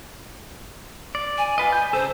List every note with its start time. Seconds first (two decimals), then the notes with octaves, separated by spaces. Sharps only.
1.15 D5
1.38 G#5
1.58 F4 B4 D#5
1.73 G#5 G6
1.93 C#3 G#4 A4 C5